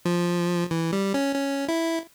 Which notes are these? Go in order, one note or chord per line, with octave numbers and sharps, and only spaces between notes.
F3
E3
G3
C#4
C#4
E4